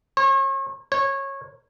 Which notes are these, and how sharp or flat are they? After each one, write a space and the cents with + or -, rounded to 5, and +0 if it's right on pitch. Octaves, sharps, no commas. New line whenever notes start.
C#5 -40
C#5 -20